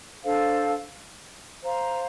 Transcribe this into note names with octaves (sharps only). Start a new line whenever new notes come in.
D4 A4 C5 F5
C5 F5 A#5